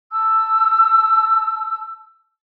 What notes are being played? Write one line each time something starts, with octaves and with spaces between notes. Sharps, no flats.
A5 E6